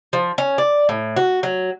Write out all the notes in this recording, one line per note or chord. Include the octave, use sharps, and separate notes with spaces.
F3
C#4
D5
A2
F#4
F#3